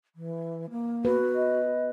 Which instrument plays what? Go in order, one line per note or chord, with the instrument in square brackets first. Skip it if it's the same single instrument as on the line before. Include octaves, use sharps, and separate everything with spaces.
[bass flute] E3
A#3
[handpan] B3 B4 [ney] F#4
[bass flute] D#5